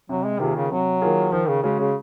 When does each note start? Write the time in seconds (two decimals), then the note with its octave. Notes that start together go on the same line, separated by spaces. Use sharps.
0.09 C3 F#3
0.25 G#3
0.39 C3 D#3 A#3 F4 G#4
0.55 C#3
0.71 C3 F#3
1.02 D#3 A#3 F4 G#4
1.32 D#3 F3
1.48 C#3
1.63 C#3 G#3 C#4 F#4
1.79 C#3